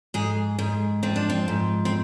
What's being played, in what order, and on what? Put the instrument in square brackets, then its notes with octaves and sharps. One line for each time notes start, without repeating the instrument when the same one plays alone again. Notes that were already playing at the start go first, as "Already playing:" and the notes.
[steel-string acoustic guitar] G#2 G#4
G#2 G#4
F3 C4
D4
C4
G#2
C4